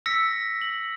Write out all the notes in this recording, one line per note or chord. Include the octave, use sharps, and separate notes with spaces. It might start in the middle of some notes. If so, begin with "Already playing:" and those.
E6 A#6 B6 C#7
F#7